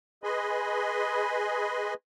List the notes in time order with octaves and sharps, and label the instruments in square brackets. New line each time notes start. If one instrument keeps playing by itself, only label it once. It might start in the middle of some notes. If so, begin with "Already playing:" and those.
[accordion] G#4 B4 D#5 G#5 B5 C6